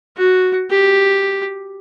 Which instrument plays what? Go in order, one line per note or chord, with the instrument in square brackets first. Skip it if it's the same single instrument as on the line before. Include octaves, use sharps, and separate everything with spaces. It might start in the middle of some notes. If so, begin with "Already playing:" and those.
[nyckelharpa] F#4
G4